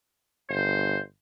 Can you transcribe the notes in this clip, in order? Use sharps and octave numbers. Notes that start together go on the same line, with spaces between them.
G1 C5